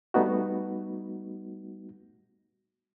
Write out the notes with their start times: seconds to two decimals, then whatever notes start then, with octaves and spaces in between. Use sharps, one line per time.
0.14 G3 A3 B3 D#4 F#4